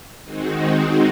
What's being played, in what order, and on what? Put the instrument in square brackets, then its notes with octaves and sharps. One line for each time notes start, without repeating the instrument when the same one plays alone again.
[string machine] D#3 G#3 C4 D#4 F#4